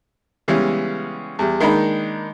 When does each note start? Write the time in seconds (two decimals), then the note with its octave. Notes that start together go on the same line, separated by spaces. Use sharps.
0.48 C#3 E3 G3 G#3 B3 C#4
1.39 E2 G3
1.60 D#3 G#3 A#3 D4 D#4 B5